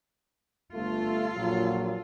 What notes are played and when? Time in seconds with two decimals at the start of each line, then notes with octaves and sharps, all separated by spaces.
0.74 G1 A3 F4 A4
1.35 A#1 A#2 F#3